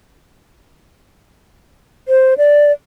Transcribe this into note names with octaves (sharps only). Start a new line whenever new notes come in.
C5
D5